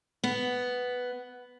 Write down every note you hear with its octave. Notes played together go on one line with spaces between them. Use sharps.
B3